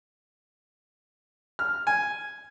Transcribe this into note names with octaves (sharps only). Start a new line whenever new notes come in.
F6
G#5